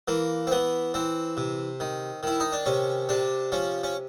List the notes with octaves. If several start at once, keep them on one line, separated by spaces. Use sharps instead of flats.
E3 A#3
C4
E3 B3
E3 C4
C3
D#3
D#3 E4
D#4
D4
C3 C#4
C3 D4
F3 C#4
C#4